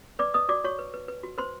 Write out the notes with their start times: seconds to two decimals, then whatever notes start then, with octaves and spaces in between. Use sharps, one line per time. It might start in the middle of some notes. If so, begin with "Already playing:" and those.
0.19 B4 D5 D6
0.34 B4 D#5 D#6
0.49 F#4 D5 D6
0.64 F#4 C#5 C#6
0.79 B4
0.94 B4
1.08 B4
1.23 F#4
1.38 B4 C5 C6